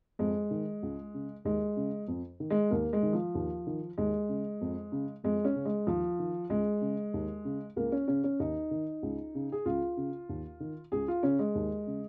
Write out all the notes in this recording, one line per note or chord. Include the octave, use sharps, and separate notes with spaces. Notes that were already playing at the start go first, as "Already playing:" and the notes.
F2 G#3
D#3
C#2
C#3
D#2 G#3
C#3
F2
D#3
G#3
D#2 A#3
G#3
D#3
F3
D#2
D#3
D#2 G#3
C#3
F2
C#3
F2 G#3
C#4
C#3
G#3
D#2 F3
D#3
C#2 G#3
C#3
D#2
C#3
C#2 A#3
C#4
C#3 C#4
C#4
D#2 D#4
D#3
C#2
C#3
G#4
C#2 F4
C#3
D#2
D#3
C#2 G#4
F4
C#3 C#4
G#3
D#2
C#3